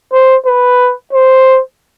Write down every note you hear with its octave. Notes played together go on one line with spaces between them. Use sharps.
C5
B4
C5